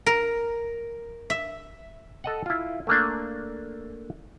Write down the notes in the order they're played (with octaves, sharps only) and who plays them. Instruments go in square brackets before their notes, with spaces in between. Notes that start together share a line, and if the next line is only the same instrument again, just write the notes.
[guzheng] A#4
E5
[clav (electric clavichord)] A4 D#5 F#5
E4 F4
A3 A#3 D4